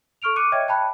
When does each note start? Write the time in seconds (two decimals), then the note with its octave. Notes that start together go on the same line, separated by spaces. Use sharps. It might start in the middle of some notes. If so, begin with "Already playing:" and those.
0.22 A4 C#6 F6 D7 F7
0.36 D6 F#6 C#7 D#7
0.52 C#5 D#5 E5 G5 G#6
0.68 G5 A5 B5 F#6